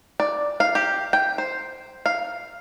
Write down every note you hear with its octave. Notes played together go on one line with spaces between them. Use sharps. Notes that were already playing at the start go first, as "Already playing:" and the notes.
D5
F5
G4
G5
C5
F5